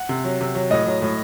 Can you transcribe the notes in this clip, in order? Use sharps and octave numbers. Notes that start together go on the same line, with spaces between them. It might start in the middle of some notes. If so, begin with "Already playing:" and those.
Already playing: F#5
C3
F#3
C3
F#3
A2 D#5
F#3
A2